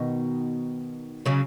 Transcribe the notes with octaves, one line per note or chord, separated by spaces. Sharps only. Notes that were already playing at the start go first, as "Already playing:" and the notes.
Already playing: B2 D#3
C#3 F#3